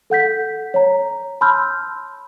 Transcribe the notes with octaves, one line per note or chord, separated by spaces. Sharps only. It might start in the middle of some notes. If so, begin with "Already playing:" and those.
A4 F#5 G6 B6
C#5 A#5
A5 B5 C6 E6 F6 G6